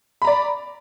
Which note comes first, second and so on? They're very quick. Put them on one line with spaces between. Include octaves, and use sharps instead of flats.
B5 A#5 D5